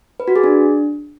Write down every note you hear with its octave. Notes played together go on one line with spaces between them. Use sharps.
B4
F#4
G#4
D4